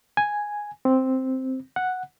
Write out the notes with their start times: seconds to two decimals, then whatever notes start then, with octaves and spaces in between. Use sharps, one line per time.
0.17 G#5
0.85 C4
1.76 F#5